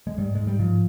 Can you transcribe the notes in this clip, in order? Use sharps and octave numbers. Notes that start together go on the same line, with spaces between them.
G#3
G#2 G3
G#2 G#3
G3
G#2 F3